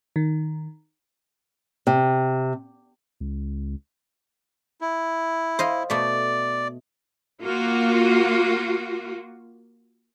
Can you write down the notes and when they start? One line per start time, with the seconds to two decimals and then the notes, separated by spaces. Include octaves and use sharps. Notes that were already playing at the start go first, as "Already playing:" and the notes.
0.16 D#3
1.87 C3
3.20 C#2
4.81 E4
5.59 C5 D#5 F5
5.90 B2 A3 D5
7.41 A#3 F4 F#4